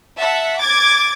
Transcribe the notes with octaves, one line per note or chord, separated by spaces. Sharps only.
E5 F#5 A5
D6 G#6 A6